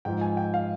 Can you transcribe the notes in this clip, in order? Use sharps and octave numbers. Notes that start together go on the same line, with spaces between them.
G#2 F3 G5
G#5
G5
F5